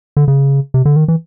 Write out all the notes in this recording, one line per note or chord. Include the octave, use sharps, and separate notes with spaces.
D3
C#3
C3
D3
D#3
E3